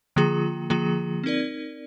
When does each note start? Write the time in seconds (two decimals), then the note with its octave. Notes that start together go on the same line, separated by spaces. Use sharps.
0.16 D3 F3 A#3 F4 G#4
0.70 D3 F3 A#3 F4 G#4
1.24 C4 D#4 A#4 D5